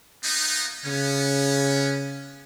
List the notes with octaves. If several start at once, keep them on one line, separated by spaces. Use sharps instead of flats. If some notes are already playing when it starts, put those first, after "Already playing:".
A#3 B3 D#4
C#3 B3 C#4